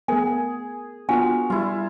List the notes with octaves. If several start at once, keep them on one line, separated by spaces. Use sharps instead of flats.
A3 B3 G#4 A#4 G#5
B3 D4 F4 F#4 A#4 G#5
G3 E4 F4